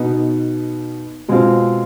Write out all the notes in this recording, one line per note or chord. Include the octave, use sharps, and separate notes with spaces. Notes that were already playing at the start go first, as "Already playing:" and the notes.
Already playing: B2 B3 D#4
B2 G#3 C4 F4